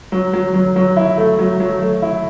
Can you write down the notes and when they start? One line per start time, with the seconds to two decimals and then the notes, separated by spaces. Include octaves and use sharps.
0.12 F#3
0.33 F#3
0.54 F#3
0.76 F#3
0.96 E4
1.18 A3
1.39 F#3
1.60 F#3
1.81 A3
2.02 E4